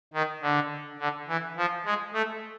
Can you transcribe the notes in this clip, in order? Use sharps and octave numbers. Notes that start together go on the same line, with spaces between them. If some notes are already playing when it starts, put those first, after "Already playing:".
D#3
D3
D3
E3
F3
G#3
A3